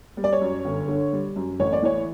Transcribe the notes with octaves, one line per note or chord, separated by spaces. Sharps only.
G3
D5
C#5
F#2
G1
D3
G3
F#2
A1 C#5
D5
E3 C#5